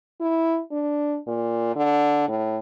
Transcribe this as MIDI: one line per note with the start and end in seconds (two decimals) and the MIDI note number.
0.20 0.60 64
0.71 1.17 62
1.27 1.74 46
1.76 2.25 50
2.28 2.58 45